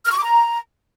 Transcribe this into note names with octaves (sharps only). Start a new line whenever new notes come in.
F6
C#6
D6
A#5